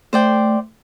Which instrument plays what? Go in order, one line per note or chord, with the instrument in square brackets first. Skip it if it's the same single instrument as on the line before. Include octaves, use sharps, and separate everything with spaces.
[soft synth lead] A3 [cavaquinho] C5 D5 G5